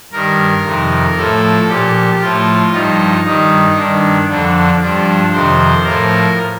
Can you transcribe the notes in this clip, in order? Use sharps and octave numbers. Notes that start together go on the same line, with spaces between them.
G2 D#3 A#4
F2 C3 D#3
A2 F3 A4
A#2 F3 G4
A2 F3 F4
G2 F3 D#4
G2 D#3 D#4
G2 D#3 D4
F2 D3 F3 D4
G2 F3 D4
F2 C3 D#3 C5
A2 F3 A#4